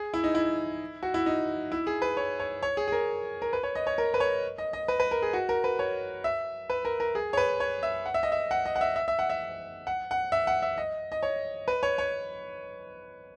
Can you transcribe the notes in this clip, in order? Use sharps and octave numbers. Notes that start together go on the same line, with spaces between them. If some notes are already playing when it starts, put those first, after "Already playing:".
Already playing: G#4
E4
D#4
E4
F#4
E4
D#4
E4
G#4
B4
C#5
C#5
C#5
G#4
G#4
A#4
A#4
B4
C#5
D#5
C#5
A#4
B4
C#5
D#5
D#5
B4
B4
A#4
G#4
F#4
A#4
B4
C#5
E5
B4
A#4
A#4
G#4
C#5
B4
C#5
E5
F#5
E5
D#5
E5
F#5
D#5
F#5
E5
E5
E5
F#5
E5
F#5
F#5
E5
F#5
E5
D#5
D#5
C#5
B4
C#5
C#5